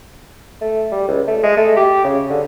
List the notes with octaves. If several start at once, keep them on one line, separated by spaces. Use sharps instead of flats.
A3
G3
C#2
A3
G#3
A3
G4
C#3
D3